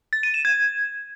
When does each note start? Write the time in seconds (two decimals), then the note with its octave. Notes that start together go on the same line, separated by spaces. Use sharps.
0.13 A6
0.23 D#7
0.34 E7
0.45 G#6